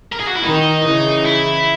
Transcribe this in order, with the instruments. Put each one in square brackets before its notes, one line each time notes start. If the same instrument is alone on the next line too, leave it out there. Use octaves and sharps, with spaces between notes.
[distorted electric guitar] A#4
G#4
F#4
E4
[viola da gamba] D#3 [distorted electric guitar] D#4
[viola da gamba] C#3 E3
[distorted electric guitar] E4